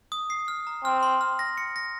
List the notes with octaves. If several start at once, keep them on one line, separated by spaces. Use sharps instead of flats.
D#6
C7
F6
A#5
C4 F6
C6
F6
A#6
C#7
A#6